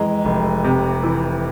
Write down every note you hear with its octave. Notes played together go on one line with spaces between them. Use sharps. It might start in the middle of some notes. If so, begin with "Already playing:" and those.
Already playing: F2 E3 G#3 A#5
F1
C3
E3